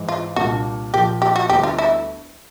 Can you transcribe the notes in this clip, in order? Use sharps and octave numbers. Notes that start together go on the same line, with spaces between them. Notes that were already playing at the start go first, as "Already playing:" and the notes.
Already playing: G#2 E3 G#3
F4
C2 A#2 G3 A#3 D4 F#4
A#2 F3 A#3 G4
G4
F#4
D2 D3 G3 B3 G4
F4
E4